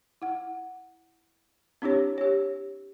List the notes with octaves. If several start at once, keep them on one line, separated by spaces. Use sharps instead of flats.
E4 F#5
C4 D4 E4 G4 C#5
G4 C#5